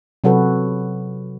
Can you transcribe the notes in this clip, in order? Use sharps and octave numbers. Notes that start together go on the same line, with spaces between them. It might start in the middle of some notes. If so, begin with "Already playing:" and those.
C3 F#3 F#4 A4 B4